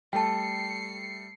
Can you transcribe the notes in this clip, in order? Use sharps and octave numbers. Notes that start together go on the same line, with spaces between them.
G3 A3 A4 G5 A5 C7 C#7